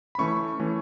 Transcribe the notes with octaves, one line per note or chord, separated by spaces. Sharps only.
B5
E3 A3 C#4 C#6
E3 A3 C#4